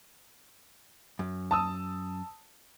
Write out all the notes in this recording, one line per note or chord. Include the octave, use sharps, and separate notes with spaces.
F#2
A5 D#6 E6